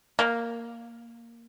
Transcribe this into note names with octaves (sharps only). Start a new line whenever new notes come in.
A#3